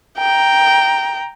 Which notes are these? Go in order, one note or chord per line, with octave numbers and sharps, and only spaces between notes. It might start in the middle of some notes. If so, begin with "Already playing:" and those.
G5 A#5